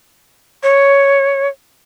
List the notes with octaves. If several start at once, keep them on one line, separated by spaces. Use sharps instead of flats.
C#5